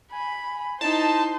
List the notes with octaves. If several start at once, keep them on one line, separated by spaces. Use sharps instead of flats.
G#5 B5
D#4 E4 C5 A5